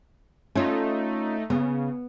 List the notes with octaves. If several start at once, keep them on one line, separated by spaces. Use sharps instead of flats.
A3 C#4 D#4 F4
C#3 B3